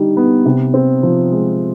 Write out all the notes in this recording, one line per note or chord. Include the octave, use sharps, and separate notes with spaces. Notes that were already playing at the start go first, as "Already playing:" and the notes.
Already playing: D3 G3 D#4
B3
C3
C4
F3
G#3